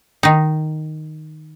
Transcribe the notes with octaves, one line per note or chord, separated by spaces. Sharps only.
D#3 D#4